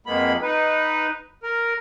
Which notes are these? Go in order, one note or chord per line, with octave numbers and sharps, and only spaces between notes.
F2 G#3 A#3 B3 B5
D#4 B4
A#4